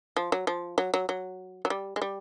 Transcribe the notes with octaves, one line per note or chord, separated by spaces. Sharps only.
F3
F#3
F3
F#3
F#3
F#3
F#3
G3
G#3
G3